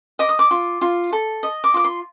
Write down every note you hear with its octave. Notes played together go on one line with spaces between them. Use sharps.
D#5 D6
D#6
D6
F4
F4
A4
D#5
D6
F4 D6
C6